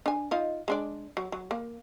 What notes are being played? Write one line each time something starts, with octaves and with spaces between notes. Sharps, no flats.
D4 G#5
D#4 F4 D#5
G#3 D4 D5
F#3
F#3
A#3